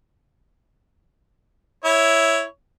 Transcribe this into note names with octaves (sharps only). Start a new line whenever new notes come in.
E4 C#5